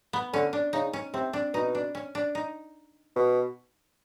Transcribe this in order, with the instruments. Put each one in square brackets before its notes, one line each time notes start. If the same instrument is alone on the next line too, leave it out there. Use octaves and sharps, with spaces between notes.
[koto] B3
[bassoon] D3 [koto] C#4
[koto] D4
[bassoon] C#3 [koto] D#4
[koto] C#4
[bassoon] C3 [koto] C4
[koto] D4
[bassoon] B2 [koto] D#4
[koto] D4
C#4
D4
D#4
[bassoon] B2